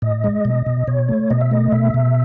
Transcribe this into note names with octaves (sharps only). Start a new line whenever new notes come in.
A2 D#5
G#3
B2
B2
B2 C#5
A3
B2 D#5
E5
A3 D#5
B2 E5
B2